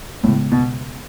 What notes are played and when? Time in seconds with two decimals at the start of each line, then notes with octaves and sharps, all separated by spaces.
0.23 A2 C#3 G#3 B3
0.52 B2